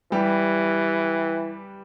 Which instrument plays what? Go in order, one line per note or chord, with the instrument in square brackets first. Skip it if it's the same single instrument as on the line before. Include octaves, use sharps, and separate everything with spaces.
[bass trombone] E3 [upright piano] G3 G4